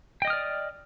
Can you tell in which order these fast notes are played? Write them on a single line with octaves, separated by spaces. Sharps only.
G5 D#5 D#6 F6 D5